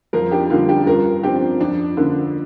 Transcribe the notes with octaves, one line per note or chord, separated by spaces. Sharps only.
F2 F4 A#4
D4 G4
D3 G3 A#3 F4
D4 G4
G2 F4 A#4
F3 C4 D4 G4
F2 D4
D3 A#3